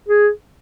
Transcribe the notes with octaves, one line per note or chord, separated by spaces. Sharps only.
G#4